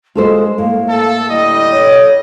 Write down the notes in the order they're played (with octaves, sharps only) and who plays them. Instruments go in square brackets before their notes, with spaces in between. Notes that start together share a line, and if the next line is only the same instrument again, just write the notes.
[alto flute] G#3 [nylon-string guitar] F4 A4 C5
[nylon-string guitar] A2 [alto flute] A#3 [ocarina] F5
[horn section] A4
[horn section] D3 G3 D#5 [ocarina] E4
[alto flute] A4 [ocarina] C#5